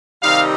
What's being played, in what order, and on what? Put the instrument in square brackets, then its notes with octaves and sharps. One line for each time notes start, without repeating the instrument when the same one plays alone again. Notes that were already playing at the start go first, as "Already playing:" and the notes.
[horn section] C3 D#3 G3 C4 D#4 F5